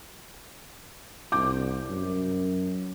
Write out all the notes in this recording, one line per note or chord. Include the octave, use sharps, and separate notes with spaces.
C2 D6 G6
F#2